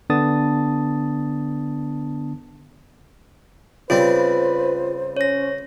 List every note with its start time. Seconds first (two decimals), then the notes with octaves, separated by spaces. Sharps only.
0.10 D3 B3 D4 A5 D#6 A6
3.90 C#3 G3 C4 F4 B4 C5
5.16 C#4 C#5 A#6